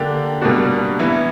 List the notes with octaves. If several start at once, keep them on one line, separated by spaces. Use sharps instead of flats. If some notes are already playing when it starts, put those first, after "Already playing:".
Already playing: D3 A#3 D4 G4
B2 G3 A#3 D4 F#4
E3 B3 E4